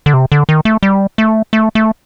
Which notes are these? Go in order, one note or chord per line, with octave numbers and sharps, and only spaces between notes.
D3
C3
D3
D#3
A3
G3
A3
A3
A3